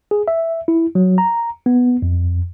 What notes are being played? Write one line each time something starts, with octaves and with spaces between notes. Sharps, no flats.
G#4
E5
E4
F#3
A#5
B3
F2